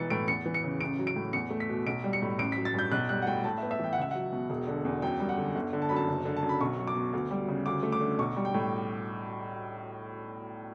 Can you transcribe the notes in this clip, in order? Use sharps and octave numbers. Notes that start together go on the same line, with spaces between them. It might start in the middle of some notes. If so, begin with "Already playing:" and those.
Already playing: B1 E3 A6 C#7
A2 D7
E2 C#7
E3
C#7
C#3
A1 D7
F#3
D7
A2
E2 C#7
A3
B6
B2
B1 D7
G3
C#7
A2
A1 D7
B6
F#3
A6
G2 G6
B1 F#6
G3 F#6
F#5
A2 G5
A2 A5
E5
B3
E5
E3 G5
F#5
C#2 E5
F#3 F#5
B2
E1
D3
E2
F#2 G5
G3
F#5
D3
G1
D3
A5
F#2 B5
A5
F#1
D3
A5
F#2
B5
B1 C#6
F#3
D6
B2
D2
G3
C#3
D2 D6
A3
D6
D3
B1 C#6
G3
G5
A2